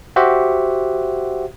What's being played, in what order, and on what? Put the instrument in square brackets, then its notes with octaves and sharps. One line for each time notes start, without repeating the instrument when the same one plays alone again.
[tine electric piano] F#4 G4 C5 E5 F#5